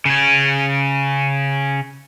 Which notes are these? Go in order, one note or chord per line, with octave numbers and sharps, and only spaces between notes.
C#3 C#4